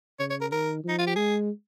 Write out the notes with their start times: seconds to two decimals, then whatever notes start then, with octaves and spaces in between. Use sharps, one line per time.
0.20 C#3 C#5
0.30 C#5
0.41 A#4
0.52 D#3 A#4
0.84 F3 D#4
0.98 F4
1.07 G4
1.16 G#3 G#4